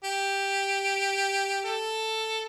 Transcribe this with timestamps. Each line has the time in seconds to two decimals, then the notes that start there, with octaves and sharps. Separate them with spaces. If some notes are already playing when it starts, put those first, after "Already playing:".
0.04 G4
1.65 A4